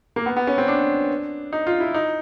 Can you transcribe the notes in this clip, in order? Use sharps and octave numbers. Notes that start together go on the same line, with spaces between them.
A#3
B3
B3
C#4
C4
D4
D#4
F4
E4
D#4